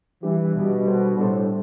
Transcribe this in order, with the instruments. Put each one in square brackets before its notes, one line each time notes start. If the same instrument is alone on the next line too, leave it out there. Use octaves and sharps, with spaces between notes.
[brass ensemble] E3 [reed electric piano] G3 D4 G4
[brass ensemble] B2 [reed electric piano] G3 D4 G4
[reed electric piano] G3 D4 A4 C5
[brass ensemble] A2 [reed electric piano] G3 D4 A4 C5